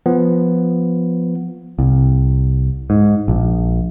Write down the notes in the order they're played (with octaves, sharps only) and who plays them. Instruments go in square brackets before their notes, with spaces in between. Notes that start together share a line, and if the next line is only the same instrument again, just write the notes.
[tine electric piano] F3 B3
[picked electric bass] C2
G#2
A#1